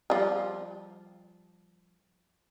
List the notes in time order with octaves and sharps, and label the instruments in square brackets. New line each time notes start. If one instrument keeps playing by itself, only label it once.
[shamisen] F3 G3